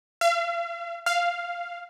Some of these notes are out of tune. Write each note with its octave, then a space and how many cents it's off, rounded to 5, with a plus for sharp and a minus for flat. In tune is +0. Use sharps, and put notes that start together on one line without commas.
F5 -40
F5 -5